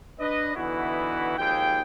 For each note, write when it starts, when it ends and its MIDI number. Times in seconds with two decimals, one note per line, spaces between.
0.19 0.52 62
0.19 0.52 71
0.19 0.52 75
0.56 1.35 50
0.56 1.35 52
0.56 1.35 59
0.56 1.35 63
0.56 1.35 64
0.56 1.35 66
1.38 1.81 32
1.38 1.81 39
1.38 1.81 53
1.38 1.81 68
1.38 1.81 79